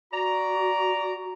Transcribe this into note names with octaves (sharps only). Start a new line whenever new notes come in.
F#4 D5 A#5